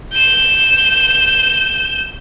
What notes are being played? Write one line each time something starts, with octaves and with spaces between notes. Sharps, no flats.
G6 E7